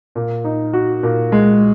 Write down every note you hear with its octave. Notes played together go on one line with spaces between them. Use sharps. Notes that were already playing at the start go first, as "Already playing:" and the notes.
A#2
D#4
F#4
A#2
G#3